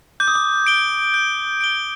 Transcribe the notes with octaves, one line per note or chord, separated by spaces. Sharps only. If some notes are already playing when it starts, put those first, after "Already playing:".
D6 G6
D#6
D6
D7 G7
G6
D7 G7